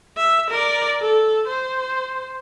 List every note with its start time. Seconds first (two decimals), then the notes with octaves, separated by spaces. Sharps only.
0.17 E5
0.50 A#4 D5
1.02 A4
1.48 C5